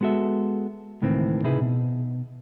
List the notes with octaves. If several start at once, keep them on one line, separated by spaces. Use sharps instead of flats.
G#3 B3 F#4 A4 E5
C#2 A2 D#3 E3 C4
C3 D#4 E4 G#4 B4
B2